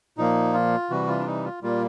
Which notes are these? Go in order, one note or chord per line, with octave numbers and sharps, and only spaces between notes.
A#2 F3 A#3 D#4
F4
C3 E3 G3 F#4
F4
D4
D#4
F4
A#2 G3 A#3 F4